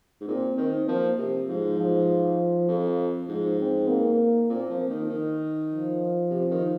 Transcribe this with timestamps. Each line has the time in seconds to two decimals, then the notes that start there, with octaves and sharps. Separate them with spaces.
0.21 G#2
0.28 A#2 C4
0.57 D#3 C4
0.87 F3 A#3
1.18 C3
1.48 G#2 F3
1.79 F3
2.69 F2
3.29 G#2 F3
3.59 C4
3.89 A#3
4.50 A#2 C4
4.70 F3
4.79 A#3
4.90 D#3
5.10 D#3
5.71 F3
6.30 C3
6.51 D#3